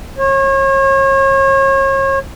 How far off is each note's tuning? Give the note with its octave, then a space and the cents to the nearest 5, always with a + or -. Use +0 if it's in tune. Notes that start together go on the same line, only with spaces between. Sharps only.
C#5 -35